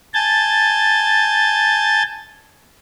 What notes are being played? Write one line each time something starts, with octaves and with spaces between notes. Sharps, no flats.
G#5 A5 G6 A6